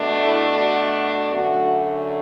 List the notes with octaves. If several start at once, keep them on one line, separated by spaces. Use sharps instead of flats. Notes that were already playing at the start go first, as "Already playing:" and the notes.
Already playing: B2 A3 D4
E4 A4
F#4
F#4
F#2 D3 A3 F#4